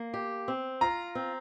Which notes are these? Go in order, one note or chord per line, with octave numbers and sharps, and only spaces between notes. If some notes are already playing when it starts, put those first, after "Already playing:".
Already playing: A#3
G4
C4
F4 A#5
C4